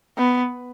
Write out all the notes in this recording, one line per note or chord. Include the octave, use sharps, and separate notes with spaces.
B3